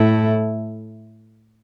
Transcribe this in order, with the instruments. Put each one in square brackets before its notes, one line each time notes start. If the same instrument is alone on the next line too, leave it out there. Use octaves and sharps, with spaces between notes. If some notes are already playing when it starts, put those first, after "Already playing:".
Already playing: [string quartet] A2 A3 E4